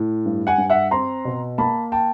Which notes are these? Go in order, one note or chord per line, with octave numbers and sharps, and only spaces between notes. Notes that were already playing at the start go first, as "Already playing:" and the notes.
Already playing: A2
G2
F#5 G#5
G2
E5 F#5
C4 A#5 C6
B2
A#3 A5 B5
G5 A5